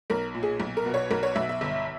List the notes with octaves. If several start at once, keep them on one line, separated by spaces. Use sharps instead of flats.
B1 A#4
A#2
G#4
B1
A#4
B2
C#5
B1 A#4
C#5
B1 E5
E5
G1